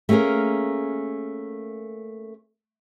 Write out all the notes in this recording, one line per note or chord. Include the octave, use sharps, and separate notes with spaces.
A3 A#3 C#4 G#4 A#4